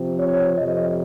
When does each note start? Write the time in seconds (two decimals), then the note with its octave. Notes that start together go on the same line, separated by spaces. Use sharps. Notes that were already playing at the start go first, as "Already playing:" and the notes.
Already playing: C3 F3 C4
0.18 C#5
0.57 F2 C3 F3 D#5